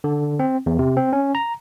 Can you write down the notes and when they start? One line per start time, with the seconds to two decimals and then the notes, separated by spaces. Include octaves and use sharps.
0.04 D3
0.39 C4
0.66 E2
0.79 C3
0.97 C4
1.13 C#4
1.35 A#5